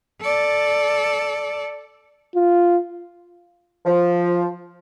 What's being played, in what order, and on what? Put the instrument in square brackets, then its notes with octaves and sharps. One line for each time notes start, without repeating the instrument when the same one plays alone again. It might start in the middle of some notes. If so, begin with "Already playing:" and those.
[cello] A4 D5
[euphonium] F4
[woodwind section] F3